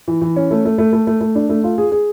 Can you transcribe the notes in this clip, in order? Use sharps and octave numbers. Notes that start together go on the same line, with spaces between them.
E3
E3
C#4
A3
A3
A3
A3
A3
A3
D4
A3
F4
G#4
G#4